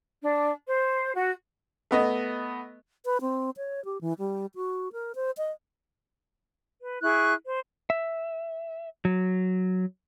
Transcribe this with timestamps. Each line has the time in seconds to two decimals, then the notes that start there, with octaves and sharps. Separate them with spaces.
0.22 D4
0.68 C5
1.15 F#4
1.91 A3 B3 D#5
3.05 B4
3.21 C4
3.57 C#5
3.85 G4
4.01 E3
4.19 G3
4.55 F#4
4.93 A#4
5.15 C5
5.37 D#5
6.81 B4
7.02 E4 G#4 C#6 F#6
7.45 C5
7.90 E5
9.05 F#3